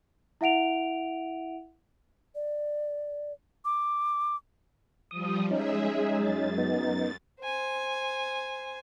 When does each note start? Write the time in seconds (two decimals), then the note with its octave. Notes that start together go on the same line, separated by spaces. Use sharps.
0.41 E4 E5 F#5 D7 F7
2.35 D5
3.65 D6
5.11 F3 G3 D#6
5.51 G#3 C#4 D#4 G#4 E5
6.15 F#2 A6
6.58 B3 D#4
7.41 C5 G#5